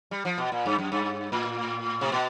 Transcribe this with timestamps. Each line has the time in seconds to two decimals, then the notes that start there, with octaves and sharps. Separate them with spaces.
0.11 G3
0.25 F3
0.38 B2
0.52 A#2
0.66 G2
0.78 F#2
0.92 G2
1.32 A2
2.01 C3
2.12 B2